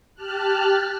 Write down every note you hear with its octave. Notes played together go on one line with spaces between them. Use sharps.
G4 A5 F6 F#6